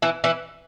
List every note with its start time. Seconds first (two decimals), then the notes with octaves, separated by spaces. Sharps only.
0.02 E3 E4
0.24 E3 E4